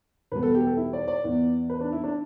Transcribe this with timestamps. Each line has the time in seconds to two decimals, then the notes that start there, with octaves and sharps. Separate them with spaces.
0.32 E2 B2 G3 B3 B4
0.43 A4
0.55 G4
0.66 A4
0.77 E4
0.93 D5
1.08 D5
1.23 E2 E3 B3
1.70 B4
1.81 D4
1.92 E4
2.04 D4